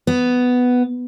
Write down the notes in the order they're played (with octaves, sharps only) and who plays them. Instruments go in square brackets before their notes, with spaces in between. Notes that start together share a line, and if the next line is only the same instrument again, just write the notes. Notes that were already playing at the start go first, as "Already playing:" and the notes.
[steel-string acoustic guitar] B3